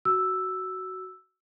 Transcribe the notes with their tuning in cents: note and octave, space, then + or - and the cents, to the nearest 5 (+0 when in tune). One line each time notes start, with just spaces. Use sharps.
F#4 +10 E6 +0